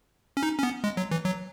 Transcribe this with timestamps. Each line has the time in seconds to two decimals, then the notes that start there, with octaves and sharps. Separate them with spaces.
0.37 C#4
0.43 D#4
0.58 C#4
0.63 B3
0.84 G#3
0.97 F#3
1.11 E3
1.25 F#3